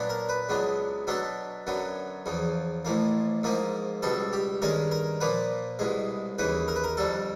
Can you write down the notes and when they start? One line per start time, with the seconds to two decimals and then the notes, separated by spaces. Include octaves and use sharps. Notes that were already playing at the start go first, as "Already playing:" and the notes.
Already playing: A#2 F#3 B3 D4
0.09 A#4
0.29 B4
0.49 C#2 C#3 F#3 B3 D4
1.07 B2 F#3 B3 D4 A4
1.67 F#2 D3 F#3 B3
2.26 E2 C#3 F3
2.85 A1 A2 F3 A#3
3.43 G#2 F3 A#3 D#4
4.02 C#2 B2 G3 A4
4.33 G4
4.62 G2 D#3 G#3 C#4 A#4
4.91 A#4
5.21 A#2 F3 A#3 B4
5.79 C2 B2 G#3
6.38 D#2 C#3 E3 B4
6.68 A#4
6.76 B4
6.84 A#4
6.97 F2 D3 G3 A4